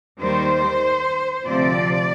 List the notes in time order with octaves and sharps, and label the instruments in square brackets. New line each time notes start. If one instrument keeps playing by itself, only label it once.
[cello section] D#2 D#3 G3 C5
D2 C3 F3 C4 D5